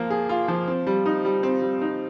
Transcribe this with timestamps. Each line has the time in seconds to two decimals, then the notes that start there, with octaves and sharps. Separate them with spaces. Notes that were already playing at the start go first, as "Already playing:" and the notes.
Already playing: F3 A#3
0.10 G#4
0.29 F4
0.48 F3
0.67 C4
0.87 G3
1.06 D#4
1.25 G3
1.43 C4
1.62 G3
1.81 D#4